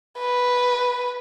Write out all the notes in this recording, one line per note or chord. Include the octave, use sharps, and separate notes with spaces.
B4